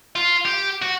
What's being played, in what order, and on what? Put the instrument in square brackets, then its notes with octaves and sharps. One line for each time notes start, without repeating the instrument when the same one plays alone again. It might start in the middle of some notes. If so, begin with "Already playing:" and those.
[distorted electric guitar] F4
G4
F#4